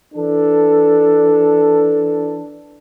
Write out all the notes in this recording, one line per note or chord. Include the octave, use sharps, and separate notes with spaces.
E3 D4 A4